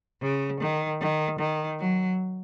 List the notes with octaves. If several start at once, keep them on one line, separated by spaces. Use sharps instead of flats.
C#3
D#3
D#3
D#3
F#3